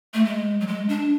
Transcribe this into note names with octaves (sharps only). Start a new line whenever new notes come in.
A3
G#3
F#3
G#3
D4